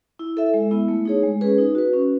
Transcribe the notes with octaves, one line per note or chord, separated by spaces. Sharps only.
E4
A4 E5
G#3
B3 E4
A3
D#4 G#4 C#5
G#3
C#4 G#4 B4
D#4
F#4 B4
C#4